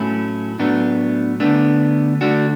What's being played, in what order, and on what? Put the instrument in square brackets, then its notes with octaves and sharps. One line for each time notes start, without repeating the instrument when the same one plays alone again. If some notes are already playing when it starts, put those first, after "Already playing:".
Already playing: [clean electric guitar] A2 F#3 A3 C#4 E4
A2 F#3 A3 B3 D4
D3 A3 B3 D4
D3 A3 D4 F#4